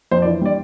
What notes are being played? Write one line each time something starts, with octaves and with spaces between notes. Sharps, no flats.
F2 C5
D5
E3
G3 D5